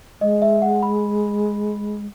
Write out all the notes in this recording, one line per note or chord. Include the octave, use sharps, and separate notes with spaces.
G#3 D#5
E5
F#5
B5